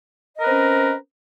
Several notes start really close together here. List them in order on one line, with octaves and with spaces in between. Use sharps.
D#5 A#4 B4 C4 C#4